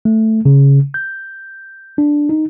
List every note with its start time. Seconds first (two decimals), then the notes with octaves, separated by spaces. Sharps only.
0.05 A3
0.45 C#3
0.94 G6
1.98 D4
2.29 D#4